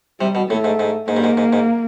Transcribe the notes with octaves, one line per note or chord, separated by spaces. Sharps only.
C3 G3
B2
A2 A3
G#2
G#2
G#2 A#3
G2
G#2
G#2
G#2